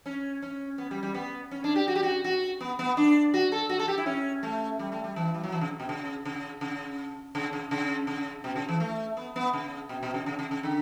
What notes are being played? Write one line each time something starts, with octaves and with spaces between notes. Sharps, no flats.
C#4
C#4
B3
G3
G3
B3
C#4
D4
G4
F#4
G4
F#4
F#4
B3
B3
D4
F#4
A4
F#4
A4
G4
E4
C#4
A3
G3
A3
G3
E3
G3
F#3
E3
C#3
B2
C#3
C#3
C#3
C#3
C#3
C#3
C#3
B2
C#3
E3
A3
B3
B3
C#3
B2
B2
C#3
C#3
C#3
C#3
D3